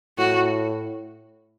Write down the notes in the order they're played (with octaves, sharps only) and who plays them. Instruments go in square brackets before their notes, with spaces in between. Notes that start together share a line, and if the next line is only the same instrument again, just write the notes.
[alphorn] A2 [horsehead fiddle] F#4